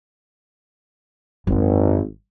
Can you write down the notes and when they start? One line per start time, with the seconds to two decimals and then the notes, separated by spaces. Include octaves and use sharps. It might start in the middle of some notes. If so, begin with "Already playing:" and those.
1.47 G#1 F#2 D3